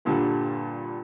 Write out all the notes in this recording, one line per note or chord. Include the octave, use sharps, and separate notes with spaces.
G2 A#2 D3 G3